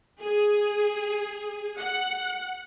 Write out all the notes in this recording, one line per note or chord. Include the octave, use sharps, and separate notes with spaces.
G#4
F#5